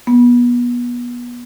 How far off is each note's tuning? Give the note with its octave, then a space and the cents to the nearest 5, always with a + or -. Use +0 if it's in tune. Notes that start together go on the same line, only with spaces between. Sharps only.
B3 -30